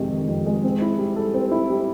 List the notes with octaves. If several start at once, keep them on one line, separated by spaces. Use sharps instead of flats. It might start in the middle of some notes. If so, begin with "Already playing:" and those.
Already playing: F2 C3 D#3 G#3
D#3
F2
G#3
C4
E4
G3
A4
C4
E4
G3